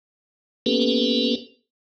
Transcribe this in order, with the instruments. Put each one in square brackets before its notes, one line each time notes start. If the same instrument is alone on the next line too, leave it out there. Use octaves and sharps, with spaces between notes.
[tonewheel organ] A#3 B3 C#4 G4 A4 B4